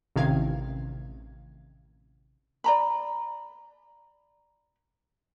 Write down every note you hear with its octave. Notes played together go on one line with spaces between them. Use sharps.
A1 C3 D#3 F5 G#6
D5 A#5 B5